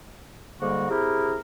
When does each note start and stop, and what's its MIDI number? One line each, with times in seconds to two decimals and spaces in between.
0.60 0.86 44
0.60 0.86 50
0.60 0.86 55
0.60 0.86 58
0.60 0.86 66
0.90 1.37 48
0.90 1.37 64
0.90 1.37 67
0.90 1.37 68
0.90 1.37 70